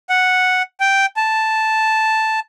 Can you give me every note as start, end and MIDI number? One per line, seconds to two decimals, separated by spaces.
0.10 0.62 78
0.80 1.06 79
1.17 2.40 81